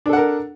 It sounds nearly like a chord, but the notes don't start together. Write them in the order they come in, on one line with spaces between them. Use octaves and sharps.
D4 A4 F#5 A#4